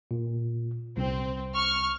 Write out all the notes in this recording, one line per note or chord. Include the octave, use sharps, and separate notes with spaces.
A#2
C2 C4
C#6 F6